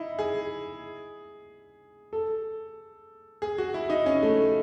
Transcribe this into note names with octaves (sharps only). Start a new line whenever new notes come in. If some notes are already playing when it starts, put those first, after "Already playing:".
Already playing: D#4 E4
G#4
A4
G#4
F#4
E4
D#4
C#4
A3